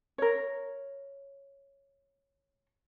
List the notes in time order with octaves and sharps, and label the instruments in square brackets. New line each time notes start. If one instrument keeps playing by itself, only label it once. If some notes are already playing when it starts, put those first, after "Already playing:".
[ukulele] A#4 C#5